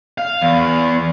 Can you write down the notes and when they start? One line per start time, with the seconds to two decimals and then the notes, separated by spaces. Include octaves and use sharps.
0.18 F5
0.41 E2